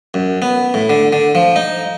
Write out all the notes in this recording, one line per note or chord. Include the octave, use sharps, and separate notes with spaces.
F#2
B3
A2
D3
D3
F3
D#4